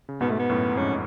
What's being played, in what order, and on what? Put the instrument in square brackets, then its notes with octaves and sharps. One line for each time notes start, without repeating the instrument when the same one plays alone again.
[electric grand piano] C#3
[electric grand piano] G#2 B2 [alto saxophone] B3
[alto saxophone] A3
B3
[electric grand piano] F#2 A2
[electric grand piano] F2 G#2 [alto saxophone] C#4